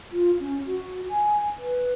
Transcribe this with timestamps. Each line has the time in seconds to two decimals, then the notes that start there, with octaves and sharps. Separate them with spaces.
0.12 F4
0.40 C#4
0.66 F#4
1.09 G#5
1.58 B4